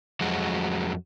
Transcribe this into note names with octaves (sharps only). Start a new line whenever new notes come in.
F2 F#3 G#3 F#4